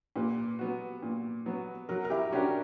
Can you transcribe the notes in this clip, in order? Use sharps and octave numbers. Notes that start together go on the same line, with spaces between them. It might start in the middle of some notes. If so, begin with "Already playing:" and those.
A#2 G4 B4
F#3 B3 F#4
A#2
F#3 B3 F#4
F#3 F#4 A#4
A#4
E4 G4
C#4 D4 F#4 G4 A#4